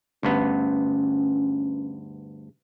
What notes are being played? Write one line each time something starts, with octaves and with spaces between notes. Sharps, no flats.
D2 G2 B3 C#4